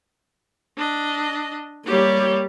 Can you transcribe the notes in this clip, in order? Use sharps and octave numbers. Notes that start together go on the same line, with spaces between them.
D4 D#5
G3 A#3 G4 C#5